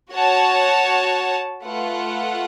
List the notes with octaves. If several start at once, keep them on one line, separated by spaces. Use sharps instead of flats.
F#4 C#5 F#5 A5
A3 F4 B4 F#5